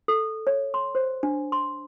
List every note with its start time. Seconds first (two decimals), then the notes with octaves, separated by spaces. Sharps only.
0.08 A4
0.47 C#5
0.74 C6
0.95 C5
1.23 D4
1.52 C6